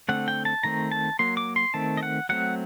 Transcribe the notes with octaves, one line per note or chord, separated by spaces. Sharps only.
D3 A3 C4 F#5
G5
A5
D#3 A3 C4 A#5
A5
F#3 A#3 C6
D6
C6
D#3 A3 C4 A5
D#5
F#5
F#3 A3 C4 F#5